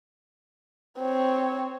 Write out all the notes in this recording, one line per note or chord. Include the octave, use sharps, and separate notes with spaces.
C4 C#5